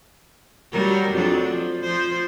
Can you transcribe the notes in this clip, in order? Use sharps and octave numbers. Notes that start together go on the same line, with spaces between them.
F#3 G3 A#4
F2 F#3 D4
F3
F3 C5